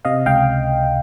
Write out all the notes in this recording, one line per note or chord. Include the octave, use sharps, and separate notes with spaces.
C3 D#5 F5
C#2 F5 G5